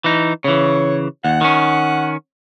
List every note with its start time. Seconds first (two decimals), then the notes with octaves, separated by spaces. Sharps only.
0.04 E3 D#4
0.44 C#3 E3 C#5
1.25 D#2 F#5
1.41 D#3 C#4